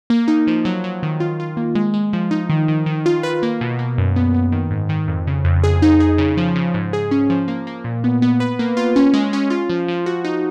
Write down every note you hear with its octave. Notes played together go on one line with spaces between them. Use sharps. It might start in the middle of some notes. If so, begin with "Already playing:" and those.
A#3
D#4
F3
F#3
F#3
D#3
F4
F4
A#3
G#3
G#3
F3
D#4
D#3
D#3
D#3
F4
B4
A#3
B2
A#3
F#2
B3
B3
D#3
G#2
D#3
F2
C#3
F2
G#4
D#4
G#4
C#3
F3
C#3
G#2
G#4
C#4
F3
A#3
A#3
A#2
B3
B3
B4
A#3
F4
C#4
G#3
C#4
F4
F3
F3
F#4
D#4